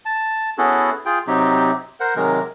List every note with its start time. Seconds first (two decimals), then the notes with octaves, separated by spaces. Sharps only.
0.06 A5
0.58 B3 C#4 E4 F#4 G#4 A4
1.06 F4 G#4 G5
1.27 C3 F#3 C4 D#4 G4
2.00 A#4 C5 F#5
2.16 C3 D#3 F#3 G#3 A#4